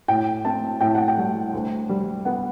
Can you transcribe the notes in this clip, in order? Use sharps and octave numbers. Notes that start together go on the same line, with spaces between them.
A2 G5
C4 A5
A2 G5
F#5
G5
G3
D2
G3
B3 F#5